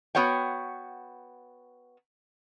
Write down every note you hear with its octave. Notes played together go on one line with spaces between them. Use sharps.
B3 F#4 C#5 F#5 G5